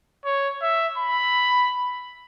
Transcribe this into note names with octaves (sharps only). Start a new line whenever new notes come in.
C#5
E5
B5